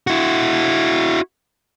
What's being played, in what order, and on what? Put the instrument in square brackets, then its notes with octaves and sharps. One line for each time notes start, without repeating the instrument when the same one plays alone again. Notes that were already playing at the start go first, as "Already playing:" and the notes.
[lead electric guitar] E4 F#4